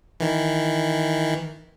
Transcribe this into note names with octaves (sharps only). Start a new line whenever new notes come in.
D#3 E3